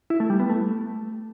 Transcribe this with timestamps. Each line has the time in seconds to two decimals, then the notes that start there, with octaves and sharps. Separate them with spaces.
0.10 E4
0.20 A3
0.30 G3
0.40 B3
0.49 A3